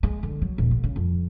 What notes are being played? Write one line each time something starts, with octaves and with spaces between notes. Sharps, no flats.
G#3
D3
F#3
D#1
A1
C#3
F2